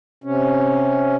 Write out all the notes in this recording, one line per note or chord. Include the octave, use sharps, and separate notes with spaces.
C3 C#4